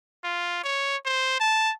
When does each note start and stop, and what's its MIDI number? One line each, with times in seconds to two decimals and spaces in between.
0.24 0.62 65
0.64 0.97 73
1.05 1.38 72
1.40 1.72 81